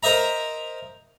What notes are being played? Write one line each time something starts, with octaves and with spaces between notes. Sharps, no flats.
A#4 C5 D#5 E5 A#5